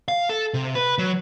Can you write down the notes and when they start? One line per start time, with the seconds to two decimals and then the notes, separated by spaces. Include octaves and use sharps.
0.08 F5
0.29 A4
0.54 C3
0.75 B4
0.98 F#3